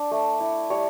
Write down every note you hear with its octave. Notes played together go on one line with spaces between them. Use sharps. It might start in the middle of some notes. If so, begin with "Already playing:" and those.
Already playing: D4 D5
A3
E4
G3 C#5